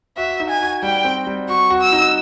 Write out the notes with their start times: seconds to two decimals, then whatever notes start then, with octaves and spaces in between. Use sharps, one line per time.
0.17 F#4 E5
0.40 D#4
0.50 G#5
0.61 F#4
0.83 G3 G5
1.05 C4
1.27 G3
1.48 F#4 C#6
1.70 F#4
1.82 E6
1.92 D#4